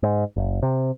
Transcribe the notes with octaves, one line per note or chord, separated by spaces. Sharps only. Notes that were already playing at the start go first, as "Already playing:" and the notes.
G#2
F#1
C3